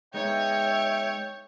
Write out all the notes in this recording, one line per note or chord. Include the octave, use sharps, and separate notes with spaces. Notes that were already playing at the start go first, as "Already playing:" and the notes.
G#3 B3 D#4 C#5 E5 G5